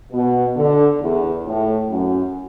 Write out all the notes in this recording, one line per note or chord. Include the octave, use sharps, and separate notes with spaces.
B2
D3
E2
A2
F#2